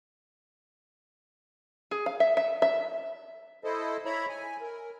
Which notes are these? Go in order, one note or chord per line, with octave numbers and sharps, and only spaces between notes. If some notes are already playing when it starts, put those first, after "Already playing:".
G#4
F5
E5
E5
E5
E4 A4 C5 D#5
E4 C#5 E5 A#5 B5
G#5
A#4